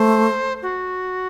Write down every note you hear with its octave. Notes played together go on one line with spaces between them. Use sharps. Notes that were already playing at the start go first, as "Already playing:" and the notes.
Already playing: A3 C5
F#4